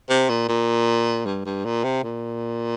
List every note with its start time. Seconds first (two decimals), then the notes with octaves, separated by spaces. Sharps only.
0.10 C3
0.29 A#2
0.48 A#2
1.26 G2
1.46 G2
1.65 A#2
1.84 C3
2.04 A#2